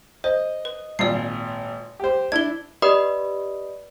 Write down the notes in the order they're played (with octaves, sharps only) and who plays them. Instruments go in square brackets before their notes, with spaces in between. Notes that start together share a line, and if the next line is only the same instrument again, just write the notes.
[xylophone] C5 [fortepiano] D#5
[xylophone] B4
[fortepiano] G#1 A#2 [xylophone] D5 C7
[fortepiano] G4 C5
[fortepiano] D4 E4 [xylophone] G#6 G7
[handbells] G4 B4 D5 D#5 B5 D#6